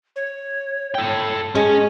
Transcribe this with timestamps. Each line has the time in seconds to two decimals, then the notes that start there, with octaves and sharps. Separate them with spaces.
0.16 C#5
0.95 A4 G5
1.55 G#3 C#4 C#5 D#5